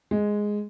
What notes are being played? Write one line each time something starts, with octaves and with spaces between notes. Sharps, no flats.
G#3